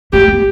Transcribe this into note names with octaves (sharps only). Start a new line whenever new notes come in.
A3 G4
B3